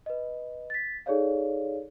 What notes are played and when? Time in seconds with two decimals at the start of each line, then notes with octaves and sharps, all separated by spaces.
0.06 B4 D#5
0.70 A6 B6
1.06 D#4 G#4 A4 C#5 D5 F5